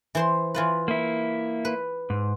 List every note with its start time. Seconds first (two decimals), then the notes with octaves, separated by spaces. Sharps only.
0.15 E3 C5 C6
0.55 E3 F4 B4
0.88 A#3 E4
1.65 B4
2.10 G#2